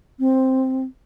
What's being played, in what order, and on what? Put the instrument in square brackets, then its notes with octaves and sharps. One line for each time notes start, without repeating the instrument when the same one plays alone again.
[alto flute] C4